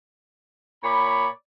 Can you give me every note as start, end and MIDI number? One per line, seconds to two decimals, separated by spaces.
0.84 1.28 46
0.84 1.28 73
0.84 1.28 74
0.84 1.28 83